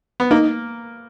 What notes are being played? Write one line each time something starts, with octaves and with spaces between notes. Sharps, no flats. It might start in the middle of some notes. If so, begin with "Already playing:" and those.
B3
A#3 D#4